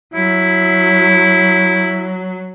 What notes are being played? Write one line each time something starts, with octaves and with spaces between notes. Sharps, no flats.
F#3 E4